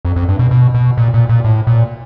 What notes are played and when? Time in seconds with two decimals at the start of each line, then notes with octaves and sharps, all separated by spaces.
0.05 F2
0.16 F2
0.29 G2
0.39 B2
0.51 B2
0.74 B2
0.97 A#2
1.14 A#2
1.29 A#2
1.44 A2
1.67 A#2